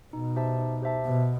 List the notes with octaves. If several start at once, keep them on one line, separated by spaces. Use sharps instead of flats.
B2 D#4
G4 C5 E5 A5
D#4
G4 C5 E5 A5
B2 B3